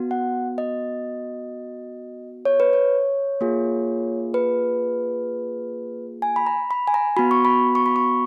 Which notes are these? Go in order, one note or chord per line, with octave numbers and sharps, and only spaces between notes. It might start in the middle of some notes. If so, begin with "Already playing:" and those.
Already playing: B3 F#4
F#5
D#5
C#5
B4
C#5
A#3 F4 G#4
B4
G#5
B5
A#5
B5
G#5
A#5
B3 F#4 B5
C#6
B5
C#6
B5
C#6